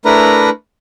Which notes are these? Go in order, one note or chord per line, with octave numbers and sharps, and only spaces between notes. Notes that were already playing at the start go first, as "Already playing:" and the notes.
A3 D4 E4 A#4 B4 A#5